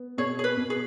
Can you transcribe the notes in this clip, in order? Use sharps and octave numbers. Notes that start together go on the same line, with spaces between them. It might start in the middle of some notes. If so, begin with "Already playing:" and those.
Already playing: B3
B2 G#4 C#5
G#4
B4
B2
G#4